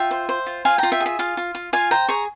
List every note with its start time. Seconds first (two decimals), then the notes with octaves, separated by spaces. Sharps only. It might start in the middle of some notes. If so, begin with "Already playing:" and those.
Already playing: F4 E5 G5
0.11 C5
0.29 C5
0.46 F4
0.65 F4 F5 G#5
0.78 F4 G5 A#5
0.92 E5 G5
1.00 G#4
1.06 E5
1.19 F4 F5
1.37 F4
1.55 F4
1.73 F4 F5 G#5
1.91 C5 G5 A#5
2.09 G#4 A#5 C#6